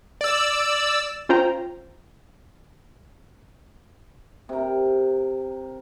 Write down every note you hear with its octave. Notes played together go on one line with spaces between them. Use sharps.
D5 E6
C#4 F4 C5 G5 A#5
C3 A#4